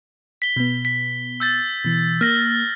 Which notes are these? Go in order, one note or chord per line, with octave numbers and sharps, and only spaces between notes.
B6 G7
B2 B3
B6
E6 G6 A6
B2 E3
A#3 F6 A6 A#6